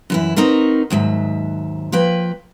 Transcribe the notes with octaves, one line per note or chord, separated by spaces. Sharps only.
F#2 E3 E4
C4 D#4 F#4 A#4 B4
D#2 G#2 F#3 E5
F3 A#3 B4 G5